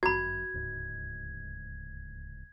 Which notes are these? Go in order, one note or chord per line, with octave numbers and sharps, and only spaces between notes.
G1 F#2 F#4 B5 G#6
D1 C#2 G#2